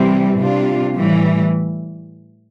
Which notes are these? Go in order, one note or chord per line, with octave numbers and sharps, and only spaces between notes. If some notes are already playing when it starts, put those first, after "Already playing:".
Already playing: C3 E3 G3 C4
C3 G3 D4 F4
A2 E3 G3